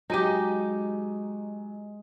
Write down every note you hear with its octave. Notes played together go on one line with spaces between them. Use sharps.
F#3 G#3 D#4 G4 D#7